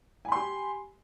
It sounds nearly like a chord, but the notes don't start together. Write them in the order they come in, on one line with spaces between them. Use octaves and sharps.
G#5 B5 C6 G4